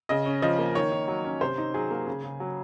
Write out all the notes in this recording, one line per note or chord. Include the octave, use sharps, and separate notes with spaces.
C#3 D#5
C#4
F3 D#5
A#3
D#3 C#5
D#3
F#3
C#4
C3 C5
D#4
F#3 G#4
A#3
C#3
C#3
F#3